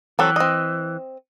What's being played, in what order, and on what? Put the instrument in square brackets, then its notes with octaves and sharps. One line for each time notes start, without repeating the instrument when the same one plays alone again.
[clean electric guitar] E3 [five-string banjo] F#3 C4 A4
[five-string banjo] C4 D#5